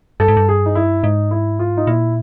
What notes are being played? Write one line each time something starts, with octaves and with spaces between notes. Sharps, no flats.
G2 A4
G#2
G2
G#4
D#4
E4
G#2 D#4
E4
F4
D#4
A#2 E4